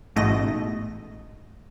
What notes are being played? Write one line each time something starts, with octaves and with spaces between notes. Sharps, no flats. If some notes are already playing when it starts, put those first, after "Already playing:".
A1 G#2 B2 A3 D#5 A#6